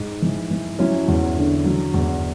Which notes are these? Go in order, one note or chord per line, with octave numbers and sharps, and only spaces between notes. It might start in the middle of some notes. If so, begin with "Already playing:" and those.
Already playing: G#2
E3
E3
F#3 C#4 E4
E2
D3
F#3
E2